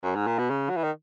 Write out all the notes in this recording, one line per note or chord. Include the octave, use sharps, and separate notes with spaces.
F#2
G#2
A#2
B2
C#3
F#3
E3
D#3